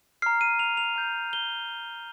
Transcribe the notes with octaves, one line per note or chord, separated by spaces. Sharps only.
A#5 F6 C7
D#7
F7
F7
A#5 G6
G7